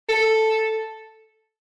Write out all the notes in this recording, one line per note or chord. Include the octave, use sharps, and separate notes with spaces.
A4